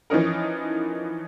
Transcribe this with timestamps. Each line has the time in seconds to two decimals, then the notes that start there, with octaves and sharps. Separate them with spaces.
0.10 E3 F3 C#4 D#4 A#4